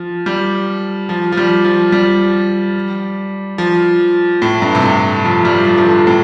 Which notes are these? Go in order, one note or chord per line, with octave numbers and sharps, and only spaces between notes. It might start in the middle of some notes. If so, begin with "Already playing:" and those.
Already playing: F3
G3
F3
F3
G3
F3
G3
F3
A2
G2
C3
A2
F3
G3
F3
F3
D3
A2